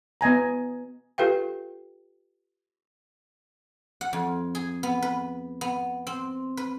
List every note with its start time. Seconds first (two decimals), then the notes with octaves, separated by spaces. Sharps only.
0.21 B3 D#5 G#5 A#5
1.18 F4 G4 A4 B4 F5 G5
4.01 F#5
4.13 F2
4.55 G#4
4.83 B3
5.02 B4
5.61 B3
6.07 C4
6.57 B4